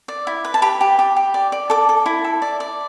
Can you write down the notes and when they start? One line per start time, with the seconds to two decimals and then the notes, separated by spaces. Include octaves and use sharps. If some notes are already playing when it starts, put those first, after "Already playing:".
0.08 D5
0.27 E4
0.45 B4
0.54 A5
0.62 G4 B5
0.81 G4
0.99 G4
1.17 G4
1.34 D5
1.52 D5
1.70 A4 D6
1.89 A4
2.06 E4
2.24 A4
2.42 D5
2.60 D5